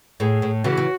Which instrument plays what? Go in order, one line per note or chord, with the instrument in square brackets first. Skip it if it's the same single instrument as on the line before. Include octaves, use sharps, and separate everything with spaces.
[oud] A2 [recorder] G#4
[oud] A2
[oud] C#3 E3 [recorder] F#4
[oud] C#3